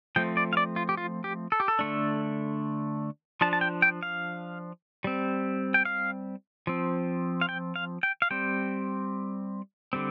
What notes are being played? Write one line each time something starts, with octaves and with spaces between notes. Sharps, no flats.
F3 A3 C4 G5
D5
F5
D5
F4
G4
F4
G4
A4
G4
A4
D3 A3 D4
F3 D4 A5
A5
G5
G5
F5
G3 C4
G5
F5
F3 C4
F5
G5
F5
G5
F5
G3 C4 G5
D3 G3 C4